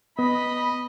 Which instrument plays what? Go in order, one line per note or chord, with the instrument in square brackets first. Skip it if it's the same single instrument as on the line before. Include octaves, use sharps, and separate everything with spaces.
[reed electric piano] B3 [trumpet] D#5 [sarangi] B5